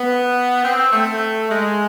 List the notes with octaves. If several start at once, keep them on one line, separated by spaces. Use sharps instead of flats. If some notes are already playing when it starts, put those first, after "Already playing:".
Already playing: B3
C4
A3
G#3